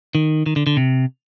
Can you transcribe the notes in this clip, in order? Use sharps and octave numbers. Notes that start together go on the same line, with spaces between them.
D#3
D#3
D3
D3
C3